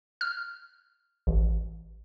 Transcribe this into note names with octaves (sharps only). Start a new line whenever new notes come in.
F6
A1